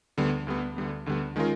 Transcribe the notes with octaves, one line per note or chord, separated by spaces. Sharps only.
D2 D3 G3 B3
D2 D3 G3 B3
D2 D3 G3 B3
D2 D3 G3 B3
D#3 G#3 C#4 F4 A#4